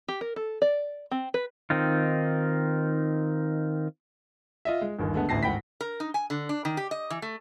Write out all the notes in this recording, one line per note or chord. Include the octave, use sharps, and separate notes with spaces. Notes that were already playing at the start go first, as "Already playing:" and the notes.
G4
A#4
A4
D5
C4
B4
D#3 C4 D#4 F4
F4 D#5 E5
G#3
G1 D#2 D#3
D3 G#3 A3 B3
A1 D2 A5 A#6 C7
G#1 F#5 G5 B5 B6
A#4
D#4
G#5
D3
D4
D#3
G4
D#5
E3
A3